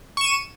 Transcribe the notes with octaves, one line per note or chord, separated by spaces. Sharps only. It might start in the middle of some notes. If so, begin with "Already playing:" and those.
C#6 D#7 E7